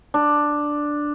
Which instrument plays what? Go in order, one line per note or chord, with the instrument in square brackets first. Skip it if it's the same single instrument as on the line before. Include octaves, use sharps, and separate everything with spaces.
[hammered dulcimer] D4